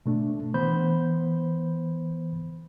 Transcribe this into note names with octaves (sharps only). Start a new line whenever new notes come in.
B2 A3 D4
E3 B3 C5 B5 G6